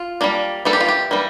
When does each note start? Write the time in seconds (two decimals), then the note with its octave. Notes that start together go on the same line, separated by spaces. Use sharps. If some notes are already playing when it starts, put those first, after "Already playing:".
Already playing: F4
0.21 G3 A#3 D4
0.65 E3 G3 A#3 A4
0.73 G4
0.81 F4
0.89 G4
1.11 E3 G3 A#3